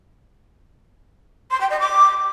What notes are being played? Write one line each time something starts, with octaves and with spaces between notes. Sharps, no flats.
C6
G5
D#5
D6